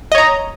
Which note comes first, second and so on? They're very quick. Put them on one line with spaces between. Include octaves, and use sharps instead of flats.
D#5 C#5 A#5